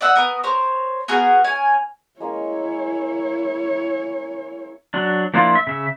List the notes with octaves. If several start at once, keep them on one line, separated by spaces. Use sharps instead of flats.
D5 D#5 F#5 E6
B3 A#4 D#6
A#4 C5 C#5
B3 F#4 G#4 A#4
C#4 A#4 G#5
G#3 A#3 C#4 E4 C#5
F#3 D4
F3 A#3 D4 E4 F4
E5
C#3 E5